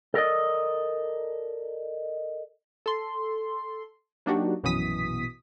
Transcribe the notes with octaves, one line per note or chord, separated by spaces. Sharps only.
A4 A#4 D5 D#5
A4 C6
F#3 A#3 D4 D#4 F#4 G4
A#1 F#2 B2 E3 D#6 B6